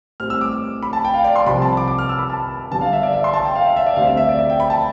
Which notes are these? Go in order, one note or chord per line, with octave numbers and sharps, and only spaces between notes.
A2 G3 C4 F6
E6
D6
B5
A5
G5
F5
D5
C6
C2 C3 F3 C4 B5
A5
D6
D6
F6
E6
B5
A5
G2 D3 G3 B3 A5
F5
E5
D5
E5
C6
A5
G5
F5
E5
E5
D5
D2 D3 G3 C4 F5
E5
E5
D5
E5
G5
B5
A5